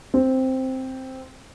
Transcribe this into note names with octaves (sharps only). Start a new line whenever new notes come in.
C4